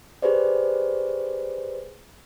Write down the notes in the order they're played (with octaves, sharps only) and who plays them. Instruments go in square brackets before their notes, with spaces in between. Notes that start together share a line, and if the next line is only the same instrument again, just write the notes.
[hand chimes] G4 G#4 B4 C5 D5